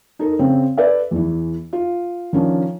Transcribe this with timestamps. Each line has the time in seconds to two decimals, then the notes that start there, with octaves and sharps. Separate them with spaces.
0.19 D#4 A4 A#4
0.39 C#3 C4
0.77 A4 B4 D5 E5
1.11 E2 E3
1.73 F4
2.33 D#3 F3 C#4 D4